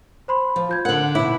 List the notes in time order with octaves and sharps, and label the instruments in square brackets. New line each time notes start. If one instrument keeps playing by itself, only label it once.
[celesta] C5 B5 C6
[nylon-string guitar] F3
[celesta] F4 G6 G#6
[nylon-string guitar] D3 F#5 [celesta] A#4 F#7
[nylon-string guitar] B2 E4 [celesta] D6